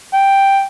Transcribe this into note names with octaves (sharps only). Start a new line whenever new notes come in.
G5